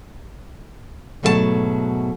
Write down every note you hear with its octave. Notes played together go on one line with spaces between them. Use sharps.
G#2 B2 F#3 A3 G#4 A5